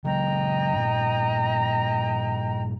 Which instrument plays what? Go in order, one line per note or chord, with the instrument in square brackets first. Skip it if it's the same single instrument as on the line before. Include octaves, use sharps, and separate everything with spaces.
[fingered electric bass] C#3 F#3 G#3 [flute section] D#5 G5 A#5
[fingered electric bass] G2 A#2